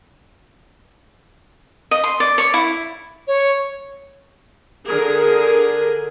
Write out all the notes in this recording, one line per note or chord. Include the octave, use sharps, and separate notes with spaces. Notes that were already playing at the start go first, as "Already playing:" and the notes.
D#5
C6
D5
C#5
E4
C#5
D3 G#4 A#4